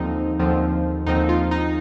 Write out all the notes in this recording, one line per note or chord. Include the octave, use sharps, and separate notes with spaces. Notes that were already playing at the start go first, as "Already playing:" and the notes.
Already playing: D#2 D3 F3 C4 D#4
D#2 D3 F3 C4
D#2 D3 F3 C4 D#4
F4
D#4